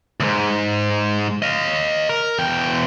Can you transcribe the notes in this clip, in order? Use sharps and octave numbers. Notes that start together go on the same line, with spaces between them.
D2 G#2
D#5 F5
A#4
E2 G5